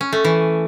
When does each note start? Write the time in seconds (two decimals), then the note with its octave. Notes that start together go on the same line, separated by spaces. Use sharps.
0.01 C#4
0.13 A3
0.24 E3